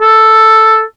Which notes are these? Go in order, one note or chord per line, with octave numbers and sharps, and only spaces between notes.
A4